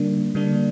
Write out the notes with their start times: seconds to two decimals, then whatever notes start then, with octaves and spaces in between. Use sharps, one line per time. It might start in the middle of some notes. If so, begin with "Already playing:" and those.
Already playing: D3 G3 A#3 D4
0.35 D3 G3 A#3 D4